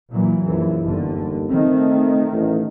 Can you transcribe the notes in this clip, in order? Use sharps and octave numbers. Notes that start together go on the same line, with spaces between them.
A#2 E3 F#3
A#1 F#2 E3
G1 D#2 D3
D#3 A3 C4
A1